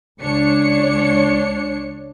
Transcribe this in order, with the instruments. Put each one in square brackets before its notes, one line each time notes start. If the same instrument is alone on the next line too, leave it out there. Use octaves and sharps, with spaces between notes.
[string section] C#2 D4 C#5 C#7